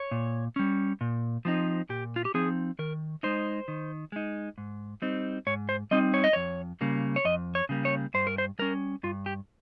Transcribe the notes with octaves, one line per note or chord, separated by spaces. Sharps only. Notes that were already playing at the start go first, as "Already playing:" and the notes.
Already playing: C#5
A#2
G3 C#4
A#2
F3 C4 D#4
A#2 G4
F4
G4
F3 C4 D#4 G#4
D#3 A#4
G#3 D#4 C5
D#3
G#3 D#4
G#2
G3 C4 D#4
G#2 C#5
C5
G3 C4 D#4 D#5
C#5
D#5
F2 C#5
C#3 G3 A#3
C#5
F2 D#5
C#5
C#3 G3 A#3
C#5
G2 C5
A#4
C5
G3 C#4 A#4
G2 F4
G4